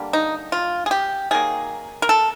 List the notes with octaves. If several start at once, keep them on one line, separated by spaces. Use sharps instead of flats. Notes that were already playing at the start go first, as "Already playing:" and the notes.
Already playing: D3 G3 A#3
D#4
F4
G#4
G4
D#3 F#3 A#3 G#4
A#4
A4